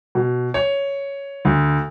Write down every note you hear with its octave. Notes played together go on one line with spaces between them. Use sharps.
B2
C#5
D2